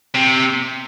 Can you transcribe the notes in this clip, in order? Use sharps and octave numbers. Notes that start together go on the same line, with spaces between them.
C3